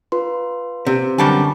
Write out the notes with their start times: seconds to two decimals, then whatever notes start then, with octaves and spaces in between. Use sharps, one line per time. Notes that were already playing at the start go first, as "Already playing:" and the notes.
0.12 F4 B4 C6
0.87 C3
1.18 F#2 D3 G3 A5